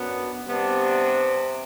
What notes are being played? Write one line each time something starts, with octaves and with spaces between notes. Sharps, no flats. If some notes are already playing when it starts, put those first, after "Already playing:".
Already playing: F#2 F#3 B3 D4
C3 G3 B3 D4